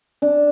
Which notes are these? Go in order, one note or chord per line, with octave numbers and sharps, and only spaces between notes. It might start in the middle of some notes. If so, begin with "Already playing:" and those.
D4